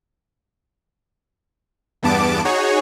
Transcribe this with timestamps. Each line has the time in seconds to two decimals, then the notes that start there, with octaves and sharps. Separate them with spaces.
2.02 E2 G2 B3 A5 D6 D7
2.45 D#4 F#4 G#4 C#5